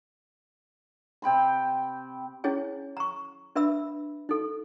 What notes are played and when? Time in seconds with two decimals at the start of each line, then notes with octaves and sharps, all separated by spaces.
1.22 C3 G5 B5 C6
2.44 C#4 E4 G#4 C#5 G#5
2.97 A#5 C#6
3.56 D4 B4 E5 B5 E6
4.29 D#4 A4